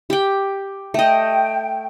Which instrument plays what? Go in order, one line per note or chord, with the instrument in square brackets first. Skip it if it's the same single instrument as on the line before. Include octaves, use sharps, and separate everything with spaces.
[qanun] G4 G5
[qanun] A3 D#5 [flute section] G5